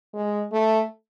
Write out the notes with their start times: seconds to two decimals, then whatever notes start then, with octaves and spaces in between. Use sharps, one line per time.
0.14 G#3
0.52 A3